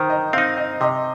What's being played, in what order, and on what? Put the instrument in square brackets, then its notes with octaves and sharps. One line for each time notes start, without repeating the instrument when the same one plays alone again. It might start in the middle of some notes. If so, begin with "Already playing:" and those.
Already playing: [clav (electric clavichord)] D#3 [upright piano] C5 A#5
[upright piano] D#5
[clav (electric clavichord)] C4 D#4 [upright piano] F5
[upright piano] D#5
[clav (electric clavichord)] C3 [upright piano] D#5